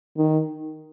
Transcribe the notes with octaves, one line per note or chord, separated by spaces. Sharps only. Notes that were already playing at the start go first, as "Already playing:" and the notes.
D#3